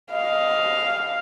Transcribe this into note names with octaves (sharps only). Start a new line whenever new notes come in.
D#5 F5